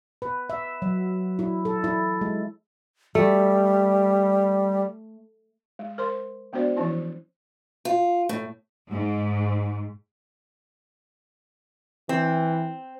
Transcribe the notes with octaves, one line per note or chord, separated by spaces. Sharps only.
B4
E5
F#3
E4
A4
E4
G#3
G3 A3
G#3
A#4 C5 C6
G#3 B3 D4 F#4 C5 D5
E3 F3 C#4 E4
F4
A2
G#2
E3 C4